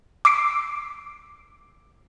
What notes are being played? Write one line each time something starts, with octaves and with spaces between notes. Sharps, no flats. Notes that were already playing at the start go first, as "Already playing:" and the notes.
D6 E6 B6 C7 D7